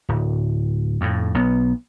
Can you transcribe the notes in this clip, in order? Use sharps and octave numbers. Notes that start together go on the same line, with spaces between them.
D1
F2 A2
B1 B3